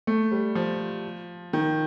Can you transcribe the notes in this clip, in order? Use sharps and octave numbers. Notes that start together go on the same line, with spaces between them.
A3
G3
F3
D#3